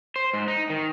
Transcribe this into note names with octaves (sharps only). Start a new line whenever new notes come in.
C5
G#2
D#4
D#3